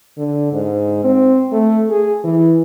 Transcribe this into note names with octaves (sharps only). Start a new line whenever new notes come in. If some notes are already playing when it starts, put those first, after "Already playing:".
D3
G#2
C4
A3
G#4
E3